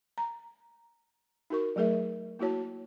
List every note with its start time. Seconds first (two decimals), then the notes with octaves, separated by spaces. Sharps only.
0.18 A#5
1.50 D#4 F#4 A#4 C#6
1.76 F#3 A3 G#4 A#4 E5
2.39 A#3 E4 F#4 C#5 A5